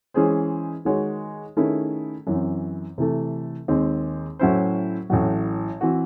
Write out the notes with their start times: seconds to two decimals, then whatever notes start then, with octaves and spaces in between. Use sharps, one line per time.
0.14 E3 G#3 C#4 G#4 C5
0.85 D#3 G#3 D#4 F#4 C#5
1.57 D#3 A3 C#4 E4 G#4
2.27 F#2 E3 C4
2.98 C3 E3 A3
3.68 D#2 D#3 G#3 C4
4.39 A2 F#3 C#4 E4 C5
5.10 A1 A2 F#3
5.81 E3 C4 F#4